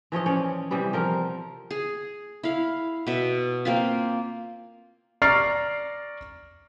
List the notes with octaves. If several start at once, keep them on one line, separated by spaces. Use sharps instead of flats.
E3 F3 C#5 D#5
C#4 C#5 D5
C3 E3 G3 B3
F3 A#4
G#4
E4 F5
B2 E5
A#3 C4 F4
D5 A#5 C#6 F6 A6 C7